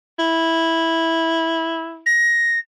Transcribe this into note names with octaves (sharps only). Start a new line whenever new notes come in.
E4
A#6